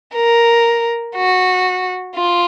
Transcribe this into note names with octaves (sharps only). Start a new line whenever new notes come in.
A#4
F#4
F4